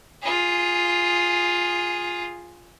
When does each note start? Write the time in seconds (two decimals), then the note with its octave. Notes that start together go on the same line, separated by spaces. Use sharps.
0.22 F4 G#4